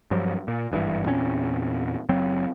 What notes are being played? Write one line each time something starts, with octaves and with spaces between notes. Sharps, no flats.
G2 F3 F#3
A#2
G#1 G2 C3 E3
E2 A#2 C4 C#4
F#1 F#3 C4